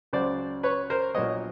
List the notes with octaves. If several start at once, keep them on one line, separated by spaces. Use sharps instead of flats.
C#2 C#3 F#3 C5 D5
B4 C#5
A#4 C5
A#1 A#2 F#3 B3 C#5 D#5